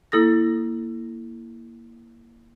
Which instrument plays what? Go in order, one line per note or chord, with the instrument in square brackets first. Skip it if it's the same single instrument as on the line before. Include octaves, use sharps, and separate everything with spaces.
[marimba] A#3 E4 A4 D#6 A#6